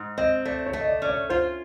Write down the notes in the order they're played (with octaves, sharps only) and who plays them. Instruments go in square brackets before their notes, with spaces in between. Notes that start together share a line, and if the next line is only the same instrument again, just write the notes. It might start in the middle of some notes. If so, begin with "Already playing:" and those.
Already playing: [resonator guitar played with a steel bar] G#2
[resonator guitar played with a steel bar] C4 [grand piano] D#5
[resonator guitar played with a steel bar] A3 [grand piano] D5
[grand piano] C#5
[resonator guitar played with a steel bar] A3
[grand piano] D#5
D5
[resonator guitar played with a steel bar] C#4 [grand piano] D5
[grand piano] C#5
[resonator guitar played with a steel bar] F4 [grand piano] C5